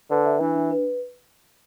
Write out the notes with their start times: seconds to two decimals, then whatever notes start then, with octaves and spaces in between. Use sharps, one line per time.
0.10 D3 B4
0.26 E5
0.40 E3 D4
0.55 D4
0.71 B4